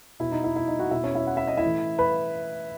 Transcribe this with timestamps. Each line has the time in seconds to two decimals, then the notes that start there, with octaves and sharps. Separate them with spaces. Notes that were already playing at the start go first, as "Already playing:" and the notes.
0.20 B2 E4
0.31 D#4
0.44 E4
0.56 E4
0.68 D#4 D#5
0.79 F#4 F#5
0.91 B2 E4 E5
1.04 C#4 C#5
1.15 E4 E5
1.27 F#5
1.37 E5
1.47 D#5
1.57 E4 E5
1.63 A2 E3
1.99 B4 B5